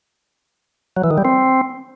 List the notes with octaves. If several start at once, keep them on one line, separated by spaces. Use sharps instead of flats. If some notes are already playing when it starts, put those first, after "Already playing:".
F#3
E3
D#3
G3
C4